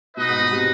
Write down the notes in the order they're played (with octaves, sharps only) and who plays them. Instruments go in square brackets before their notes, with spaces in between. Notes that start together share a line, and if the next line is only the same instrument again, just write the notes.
[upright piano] B2 [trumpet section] D#4 B4 D#5
[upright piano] G#2
B2
C3